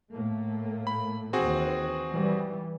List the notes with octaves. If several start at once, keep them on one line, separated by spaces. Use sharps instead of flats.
A2 A3 A#3
B5
D#2 E3 C4 F#4 G#4
E3 G3